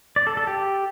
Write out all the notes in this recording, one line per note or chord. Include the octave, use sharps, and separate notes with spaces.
D5
A4
A4
G4